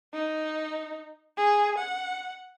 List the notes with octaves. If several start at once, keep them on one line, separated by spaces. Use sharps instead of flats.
D#4
G#4
F#5